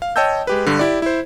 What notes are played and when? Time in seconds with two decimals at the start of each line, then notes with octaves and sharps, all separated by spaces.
0.02 F5
0.16 C#5 D#5 G5 A5 E6 G6
0.47 G#3 G4 B4
0.66 G2 D3
0.79 E4 G4 D5
1.02 E4 C5